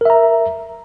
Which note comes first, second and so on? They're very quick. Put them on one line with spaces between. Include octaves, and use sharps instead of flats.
A#4 E5 A#5